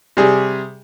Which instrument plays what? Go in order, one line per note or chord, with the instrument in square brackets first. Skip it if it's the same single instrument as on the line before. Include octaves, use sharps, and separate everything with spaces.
[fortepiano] C3 G3 G#4